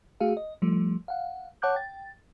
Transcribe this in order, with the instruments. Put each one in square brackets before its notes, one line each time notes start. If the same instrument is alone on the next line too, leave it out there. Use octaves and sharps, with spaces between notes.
[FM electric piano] A3 F#4 G#4 F5
D#5
F3 G3 A3
F5 F#5
C#5 F#5 A5 D6 F#6 G6
G5 A6